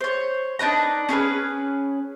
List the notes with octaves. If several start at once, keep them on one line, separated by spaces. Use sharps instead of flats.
C5 C#5
D4 D#4 B4 A#5
C#4 G#4 A#4 B4